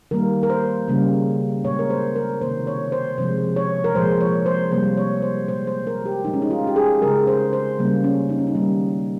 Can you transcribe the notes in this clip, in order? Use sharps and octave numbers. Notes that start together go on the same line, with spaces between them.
D#3 G3 A#3 A#4
A#4
C5
C#3 G3 A#3
A#2 G#3 C#5
A#4
C5
A#4
C3 D#3 A#3 C5
C#5
C5
C3 F3 G#3 C5
C#5
A#4
A#2 F3 G#3 C5
C#5
C5
C3 G3 A#3 C5
C#5
C5
A#2 G#3 C5
C5
A#4
G4
A#2 G#3 D#4
C#4
D#4
F4
G4
G#4
C#3 G#3 A#4
C5
C5
C#3 G3 A#3
C#4
D#4
C#4
D#4
D#3 G3 A#3